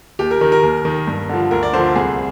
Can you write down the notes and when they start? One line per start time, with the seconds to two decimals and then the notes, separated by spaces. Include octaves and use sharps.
0.19 D#2 G4
0.31 A#4
0.41 D#3 A#4
0.52 A#4
0.63 D#2
0.85 D#3
1.07 G2
1.29 D3 F3
1.51 D2 A#4
1.63 D5
1.73 D3 F3 C5
1.96 C2 G#4